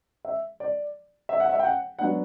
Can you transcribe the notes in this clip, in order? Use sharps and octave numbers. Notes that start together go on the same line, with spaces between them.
E5
D5
E5
F#5
E5
G5
F#5
F#3 B3 D4 F#5